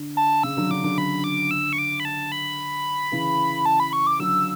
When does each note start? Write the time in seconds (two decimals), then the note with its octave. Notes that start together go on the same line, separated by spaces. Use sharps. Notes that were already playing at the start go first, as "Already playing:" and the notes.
Already playing: D3
0.17 A5
0.43 C#3 E6
0.57 D3 F#3 E6
0.70 D3 D6
0.84 D3 D6
0.97 D3 B5
1.24 D6
1.51 E6
1.73 C#6
1.78 D6
2.00 B5
2.05 A5
2.32 B5
3.12 C#3 E3
3.66 A5
3.80 B5
3.93 C#6
4.07 D6
4.19 D3 F#3 E6